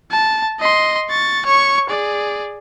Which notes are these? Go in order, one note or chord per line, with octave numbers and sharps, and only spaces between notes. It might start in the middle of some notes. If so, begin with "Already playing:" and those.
A5
D#5 C6
C#6 A6
C#5 C#6
G#4 D5